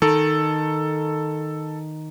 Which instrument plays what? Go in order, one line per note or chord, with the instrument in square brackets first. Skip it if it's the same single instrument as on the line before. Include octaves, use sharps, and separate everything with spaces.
[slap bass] D#3 [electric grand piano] A4